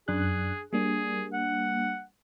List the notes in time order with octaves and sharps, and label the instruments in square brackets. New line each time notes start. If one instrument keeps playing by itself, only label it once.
[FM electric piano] F#2 D4 F#6 [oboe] G#4
[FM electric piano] G3 A#3 D4 [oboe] G#4
[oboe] F#5